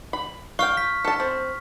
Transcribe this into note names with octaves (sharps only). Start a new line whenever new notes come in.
B5
F5 G5 C#6 F6
B6
A4 A5
C4